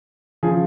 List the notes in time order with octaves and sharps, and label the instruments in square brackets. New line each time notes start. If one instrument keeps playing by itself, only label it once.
[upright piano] C#3 F3 G#4